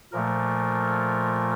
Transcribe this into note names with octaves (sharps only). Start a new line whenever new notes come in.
A#2 F3 A3 A#4